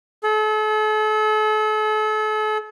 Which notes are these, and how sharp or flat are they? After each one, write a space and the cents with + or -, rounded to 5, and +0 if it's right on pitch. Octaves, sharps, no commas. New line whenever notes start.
A4 -40